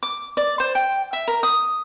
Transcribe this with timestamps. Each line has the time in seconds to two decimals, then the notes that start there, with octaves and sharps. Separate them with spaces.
0.03 D6
0.37 D5
0.60 C5
0.75 G5
1.13 E5
1.28 A#4
1.43 D#6